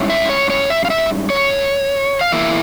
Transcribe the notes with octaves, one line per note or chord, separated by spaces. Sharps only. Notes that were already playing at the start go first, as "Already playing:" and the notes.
Already playing: G#2 G3 C#4 E4
E5
C#5
C#5
E5
F5
E5
C#5
F5
E2 E3 A#3 E4 E5